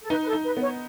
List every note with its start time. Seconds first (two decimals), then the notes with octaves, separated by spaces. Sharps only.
0.02 A4
0.10 D#4 B4
0.23 B4
0.28 A4
0.33 D#4
0.45 B4
0.57 B3
0.62 C#5